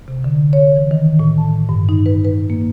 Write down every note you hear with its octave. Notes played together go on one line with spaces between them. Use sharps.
C3
D3
C#5
E3
D#3
A2
A5
G2
D#4
B4
B4
A#3